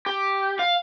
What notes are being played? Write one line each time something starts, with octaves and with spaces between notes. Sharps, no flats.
G4
F5